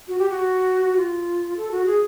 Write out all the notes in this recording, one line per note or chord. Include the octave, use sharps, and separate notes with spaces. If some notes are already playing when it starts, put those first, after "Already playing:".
F#4
G4
F#4
F4
A4
F#4
G#4